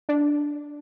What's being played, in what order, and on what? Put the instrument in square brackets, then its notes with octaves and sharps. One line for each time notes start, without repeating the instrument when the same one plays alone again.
[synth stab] D4